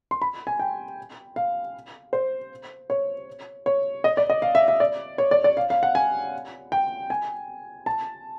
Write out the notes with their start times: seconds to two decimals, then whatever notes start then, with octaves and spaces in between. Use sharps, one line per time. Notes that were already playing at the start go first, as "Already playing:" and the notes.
0.11 C6
0.22 B5
0.47 G#5
0.60 G5
1.36 F5
2.13 C5
2.90 C#5
3.66 C#5
4.04 D#5
4.17 D5
4.30 D#5
4.42 F5
4.55 E5
4.68 E5
4.80 D5
5.18 C#5
5.31 D5
5.44 D5
5.57 F5
5.70 F5
5.83 F#5
5.95 G#5
6.72 G5
7.10 G#5
7.86 A5